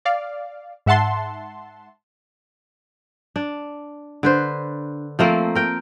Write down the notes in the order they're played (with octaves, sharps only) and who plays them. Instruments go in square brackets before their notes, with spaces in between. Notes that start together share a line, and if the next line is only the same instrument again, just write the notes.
[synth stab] D5 F5
G#2 E5 F#5 A5 C6
[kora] D4
D3 B4 C5
F3 A3 A#3 C4
A#4 G5